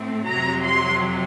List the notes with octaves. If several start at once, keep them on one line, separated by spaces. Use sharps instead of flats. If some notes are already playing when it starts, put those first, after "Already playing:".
Already playing: A2 A3 C4
F2 C3 F#3 A#5
C6